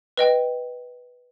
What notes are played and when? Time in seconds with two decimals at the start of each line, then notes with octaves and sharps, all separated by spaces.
0.17 B4 D#5 G5